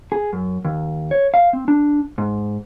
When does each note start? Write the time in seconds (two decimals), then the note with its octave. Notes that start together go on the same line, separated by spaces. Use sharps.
0.12 G#4
0.33 F#2
0.65 D#2
1.11 C#5
1.34 F5
1.53 C4
1.68 D4
2.18 G#2